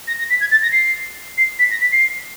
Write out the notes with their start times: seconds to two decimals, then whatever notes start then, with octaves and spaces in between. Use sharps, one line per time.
0.07 A#6
0.18 A#6
0.29 B6
0.40 G#6
0.51 A6
0.62 A#6
0.72 C7
1.37 C7
1.58 B6
1.70 A#6
1.81 B6
1.92 C7